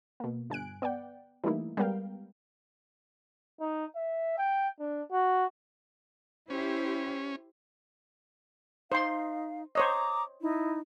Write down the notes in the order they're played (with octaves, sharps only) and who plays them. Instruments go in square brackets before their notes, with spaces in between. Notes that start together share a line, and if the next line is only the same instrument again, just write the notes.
[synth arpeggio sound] B2 A#3
G1 G#5 F#6 D7
B3 D5 F#5 G5
E3 G3 A3 A#3 D#4 E4
G3 G#3 B3 A#4 F5 G5
[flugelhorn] D#4
E5
G5
D4
F#4
[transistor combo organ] C#4 [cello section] E4 G4 C5
[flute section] D#4 F5 [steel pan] C5 C6
[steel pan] C5 C#5 D#5 [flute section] A#5 D6 D#6
[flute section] D#4 E4